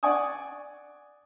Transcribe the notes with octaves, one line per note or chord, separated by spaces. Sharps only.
D5 F#5 G#5 C#6 D#6